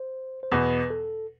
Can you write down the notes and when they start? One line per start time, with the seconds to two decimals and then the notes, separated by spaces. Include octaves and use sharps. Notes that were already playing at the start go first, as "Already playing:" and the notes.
Already playing: C5
0.43 C5
0.52 E2 B2 B3 B4
0.90 A4